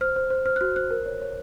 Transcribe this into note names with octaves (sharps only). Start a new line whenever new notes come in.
C5 F6
C5
C5
C5 F6
F#6
F#4 F6
C5 F#6
A#4
C#5
C#5